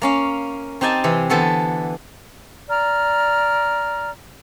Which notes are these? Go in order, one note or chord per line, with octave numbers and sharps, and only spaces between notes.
A#3 C#4 F5
C4 D#4 G4 G#5 A5
C3 E3
D3 E3 B3 A4 C5
D5 A#5 F6